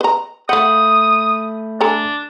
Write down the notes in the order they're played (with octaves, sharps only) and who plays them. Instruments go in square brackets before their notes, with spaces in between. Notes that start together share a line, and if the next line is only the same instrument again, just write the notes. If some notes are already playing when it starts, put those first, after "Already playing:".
[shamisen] B4 A#5
[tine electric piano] A3 B5 G6 [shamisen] F5 F#5 [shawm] D#6
[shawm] D4 [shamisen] A4 G#5 A#5